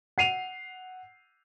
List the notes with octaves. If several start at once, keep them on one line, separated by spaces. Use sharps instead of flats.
F#5 C7 D#7 F7